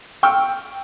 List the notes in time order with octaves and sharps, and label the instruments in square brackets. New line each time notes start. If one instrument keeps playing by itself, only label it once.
[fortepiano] G5 C#6 E6 F6